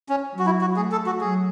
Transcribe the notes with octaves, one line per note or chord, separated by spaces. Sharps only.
C#4
F#3
F#4
E4
F#4
A3 G#4
A4
F#4
F#3 G#4